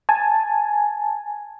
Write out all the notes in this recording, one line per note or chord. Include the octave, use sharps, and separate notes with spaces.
G#5 A5